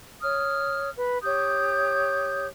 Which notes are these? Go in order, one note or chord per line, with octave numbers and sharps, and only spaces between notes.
C#5 D#6 F6
B4
G4 C#5 D#6 G6